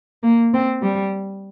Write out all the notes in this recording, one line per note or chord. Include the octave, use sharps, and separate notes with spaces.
A#3
C4
G3